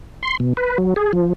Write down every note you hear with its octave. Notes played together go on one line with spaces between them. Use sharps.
C6
B2
B4
F#3
G#4
F3